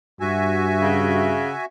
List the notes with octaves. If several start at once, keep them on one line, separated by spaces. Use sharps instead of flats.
G2 F#4 E5 G#5
C#3